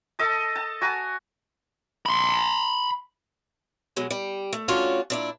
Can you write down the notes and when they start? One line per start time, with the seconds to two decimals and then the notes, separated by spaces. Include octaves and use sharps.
0.19 A4 D#5 A5
0.56 A5
0.81 F#4 G#5 A#5
2.06 B5 C6
3.96 B2 F#3 G#3
4.10 G3
4.53 A3
4.68 A3 C#4 D4 F4 F#4 C#5
5.10 A#2 D4 E4